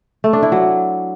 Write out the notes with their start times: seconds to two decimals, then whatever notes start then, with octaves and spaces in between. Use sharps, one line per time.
0.24 A3
0.33 D4
0.43 E4
0.52 F#3